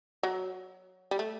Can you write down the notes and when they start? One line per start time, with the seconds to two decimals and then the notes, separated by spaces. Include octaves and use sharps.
0.23 F#3
1.11 G3
1.19 A3